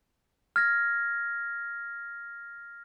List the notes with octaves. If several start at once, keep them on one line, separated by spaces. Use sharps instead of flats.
F6 G#6 A#6